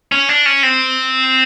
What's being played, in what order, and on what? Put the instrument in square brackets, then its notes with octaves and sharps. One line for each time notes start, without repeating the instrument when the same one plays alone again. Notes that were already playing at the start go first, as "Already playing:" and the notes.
[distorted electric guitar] C#4
D4
C#4
C4